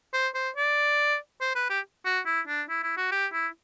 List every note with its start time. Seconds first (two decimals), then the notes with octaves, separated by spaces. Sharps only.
0.13 C5
0.35 C5
0.56 D5
1.41 C5
1.55 B4
1.70 G4
2.05 F#4
2.26 E4
2.47 D4
2.69 E4
2.83 E4
2.97 F#4
3.12 G4
3.32 E4